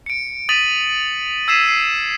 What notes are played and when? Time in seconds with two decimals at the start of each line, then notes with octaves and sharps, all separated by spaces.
0.06 C#7 D7
0.49 D#6 A6 B6 D7 D#7 F#7
1.48 E6 G#6 B6 C7 D#7 E7
1.68 C7